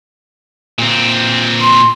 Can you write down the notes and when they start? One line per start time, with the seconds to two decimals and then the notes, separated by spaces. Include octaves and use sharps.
0.79 A#2 C4
1.61 C6